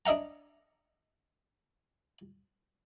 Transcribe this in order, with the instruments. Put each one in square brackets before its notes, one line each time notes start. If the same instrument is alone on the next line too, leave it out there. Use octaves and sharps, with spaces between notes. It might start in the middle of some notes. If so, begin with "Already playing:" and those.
[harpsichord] D4 D#5 E5 F#5 A#5